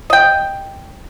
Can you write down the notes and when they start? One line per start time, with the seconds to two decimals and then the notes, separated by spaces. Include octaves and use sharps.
0.10 D#5 G5